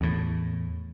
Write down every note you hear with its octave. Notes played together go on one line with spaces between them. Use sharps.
E2 A2